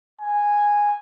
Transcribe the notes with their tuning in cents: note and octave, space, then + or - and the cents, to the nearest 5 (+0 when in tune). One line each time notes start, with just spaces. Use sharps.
G#5 -5